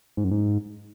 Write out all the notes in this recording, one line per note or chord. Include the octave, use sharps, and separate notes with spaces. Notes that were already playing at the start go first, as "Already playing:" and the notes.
G#2
F#2
G#2